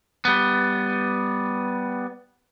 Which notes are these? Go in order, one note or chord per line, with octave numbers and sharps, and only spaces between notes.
G3 B3